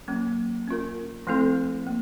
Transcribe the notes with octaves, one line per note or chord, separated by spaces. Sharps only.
F#3 A#3 C#4
C#4 F4 A#4
F3 A3 C4 E4 A4
A#3